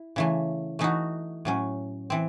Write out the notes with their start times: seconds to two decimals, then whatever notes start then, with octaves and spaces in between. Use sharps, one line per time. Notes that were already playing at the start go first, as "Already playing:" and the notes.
Already playing: E4
0.16 C#3 E3 A3
0.79 E3 A3 D#4 F#4
1.45 A2 F#3 C#4
2.10 E3 C4